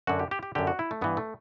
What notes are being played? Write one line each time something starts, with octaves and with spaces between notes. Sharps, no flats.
F#2 D3 F#4
G4
G4
G4
F#2 D3 G4
F#4
E4
A3
G2 E3 B3
A3